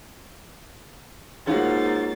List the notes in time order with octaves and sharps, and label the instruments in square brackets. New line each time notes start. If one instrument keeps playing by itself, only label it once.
[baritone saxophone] G#2 [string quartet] A#3 A6 [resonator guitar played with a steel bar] C#4 F4 F#4